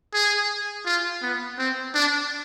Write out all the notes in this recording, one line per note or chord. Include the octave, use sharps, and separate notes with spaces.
G#4
F4
B3
C4
D4